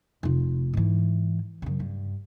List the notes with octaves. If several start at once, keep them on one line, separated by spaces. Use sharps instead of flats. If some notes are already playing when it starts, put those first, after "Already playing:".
F1 F4
G#2 E3
F#2 C#3
G2